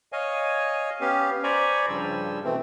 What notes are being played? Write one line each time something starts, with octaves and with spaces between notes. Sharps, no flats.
C#5 D#5 F5 G#5
B3 C#4 G4 F5
C5 D5 G#5 A#5 B5 C#6
G2 C#3 F3 G3 E6
B2 E3 A3 C4